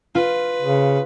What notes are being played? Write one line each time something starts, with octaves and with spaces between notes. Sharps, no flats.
F4 B4
C#3